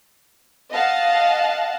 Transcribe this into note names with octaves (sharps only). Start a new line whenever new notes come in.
D#5 F5 F#5 A5